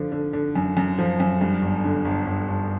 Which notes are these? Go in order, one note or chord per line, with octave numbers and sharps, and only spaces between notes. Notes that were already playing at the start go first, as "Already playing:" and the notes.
Already playing: D3 F3
D3
D3
F#2
F#2
F3
F#2
G2
G1
D3
G1
G1
G1